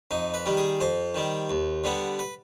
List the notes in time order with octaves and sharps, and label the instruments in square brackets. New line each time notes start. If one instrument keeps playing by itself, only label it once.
[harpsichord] F2 D#4
B4
D#3 G3
G#4
F2 C5
D#3 G3
D#2
D3 G3 B3
B4